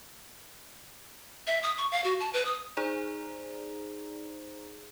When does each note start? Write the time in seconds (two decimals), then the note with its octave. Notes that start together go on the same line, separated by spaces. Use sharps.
1.47 E5
1.63 D#6
1.78 C#6
1.92 F5
2.04 F#4
2.20 A5
2.33 B4
2.45 D#6
2.77 D#4 G#4 C5 D5 A#5